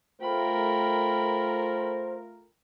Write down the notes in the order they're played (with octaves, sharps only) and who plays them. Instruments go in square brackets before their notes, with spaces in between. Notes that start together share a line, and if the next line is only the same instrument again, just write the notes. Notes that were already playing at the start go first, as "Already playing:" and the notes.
[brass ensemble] A3 F4 A#4 [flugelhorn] C5 [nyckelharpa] G5 B5